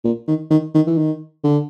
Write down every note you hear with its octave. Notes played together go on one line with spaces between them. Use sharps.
A#2
D#3
D#3
D#3
E3
D#3
D3